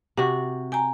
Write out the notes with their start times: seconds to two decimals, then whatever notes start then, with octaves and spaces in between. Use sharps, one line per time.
0.17 C3 F#4 F#5
0.72 G5 G#5 A#5